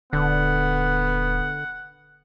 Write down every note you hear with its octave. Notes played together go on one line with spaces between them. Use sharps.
D#1 D3 B3 F#5